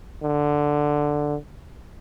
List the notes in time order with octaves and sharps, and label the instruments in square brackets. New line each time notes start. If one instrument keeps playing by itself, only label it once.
[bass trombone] D3